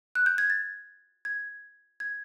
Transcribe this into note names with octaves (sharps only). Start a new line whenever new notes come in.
F#6
G6
G#6
A6
G#6
G#6